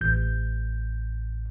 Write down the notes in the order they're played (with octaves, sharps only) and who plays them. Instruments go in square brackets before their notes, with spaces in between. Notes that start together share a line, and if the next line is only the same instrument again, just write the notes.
[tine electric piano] A1 G6